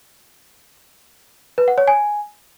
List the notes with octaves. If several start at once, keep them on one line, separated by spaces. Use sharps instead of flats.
B4
F#5
C#5
G#5